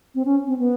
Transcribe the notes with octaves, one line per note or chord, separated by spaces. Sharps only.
C4
C#4
C4
B3